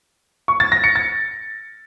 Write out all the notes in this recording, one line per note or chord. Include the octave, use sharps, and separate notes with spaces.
C#6
A6
A#6
C#7
A6